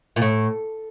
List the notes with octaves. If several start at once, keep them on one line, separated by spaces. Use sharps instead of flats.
A#2
A2